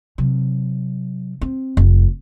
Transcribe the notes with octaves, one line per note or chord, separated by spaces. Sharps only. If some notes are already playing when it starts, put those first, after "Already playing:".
C3 F#3
C4
F1